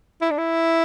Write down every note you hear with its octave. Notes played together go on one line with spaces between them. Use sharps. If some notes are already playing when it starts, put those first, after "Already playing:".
E4
D4
E4